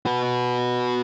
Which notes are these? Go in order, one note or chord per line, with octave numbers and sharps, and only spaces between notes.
F#4 B4